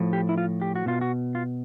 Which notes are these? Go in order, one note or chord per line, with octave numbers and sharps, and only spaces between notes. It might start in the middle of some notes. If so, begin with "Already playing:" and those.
Already playing: A2 F3
G4
E4
F4
G4
F#4
B2 F4
F#4
F4